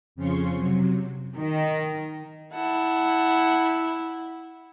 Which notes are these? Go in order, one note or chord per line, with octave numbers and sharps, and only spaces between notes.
F2 C#3 F3 C#4 C6 C#6
C3 F#3
D#3
E4 F#5 A5